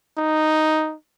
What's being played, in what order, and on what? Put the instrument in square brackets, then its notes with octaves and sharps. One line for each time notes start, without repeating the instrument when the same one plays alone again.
[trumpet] D#4